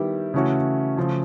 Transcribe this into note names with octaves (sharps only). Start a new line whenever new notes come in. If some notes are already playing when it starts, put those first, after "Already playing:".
Already playing: D#3 G3 B3 E4 G4
C#3 E3 A3 C#4 F#4
C#3 F3 A3